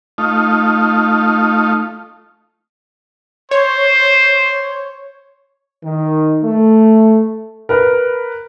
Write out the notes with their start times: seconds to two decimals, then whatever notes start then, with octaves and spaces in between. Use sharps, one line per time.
0.18 A3 D#4 F4
3.51 C5 C#5
5.84 D#3
6.42 A3
7.69 A#4 B4 A#5